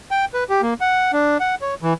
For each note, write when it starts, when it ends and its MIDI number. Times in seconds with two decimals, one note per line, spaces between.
0.11 0.25 79
0.34 0.44 71
0.50 0.61 67
0.62 0.74 58
0.81 1.11 78
1.13 1.38 62
1.40 1.55 78
1.62 1.75 73
1.82 1.93 52